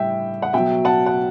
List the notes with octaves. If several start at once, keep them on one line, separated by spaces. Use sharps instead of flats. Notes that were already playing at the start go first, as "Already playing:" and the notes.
Already playing: A2 G3 E5 G5
F#5
B2 F#3 E5 G5
F#5 A5
F#5